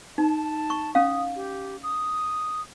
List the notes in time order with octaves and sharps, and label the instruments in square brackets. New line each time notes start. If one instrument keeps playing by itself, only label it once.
[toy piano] D#4 [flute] A5
[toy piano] C#6
[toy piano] C#4 F5 [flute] D#6
[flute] G4
D#6